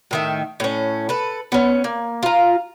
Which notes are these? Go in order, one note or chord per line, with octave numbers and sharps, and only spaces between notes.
A2 D#3 E5
A2 C#4
A4 B4
B3 C#4
A#3
F4 A#5